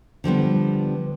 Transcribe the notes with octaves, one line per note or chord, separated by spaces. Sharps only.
D3 F3 G3 B3